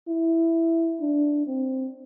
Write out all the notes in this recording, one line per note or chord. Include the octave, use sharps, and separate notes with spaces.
E4
D4
C4